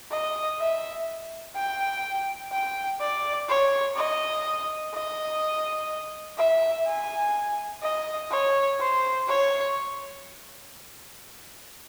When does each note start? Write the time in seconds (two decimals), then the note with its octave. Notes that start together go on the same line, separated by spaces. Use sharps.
0.11 D#5
0.60 E5
1.56 G5
2.52 G5
3.01 D5
3.49 C#5
3.96 D#5
4.94 D#5
6.38 E5
6.87 G#5
7.83 D#5
8.31 C#5
8.80 C5
9.28 C#5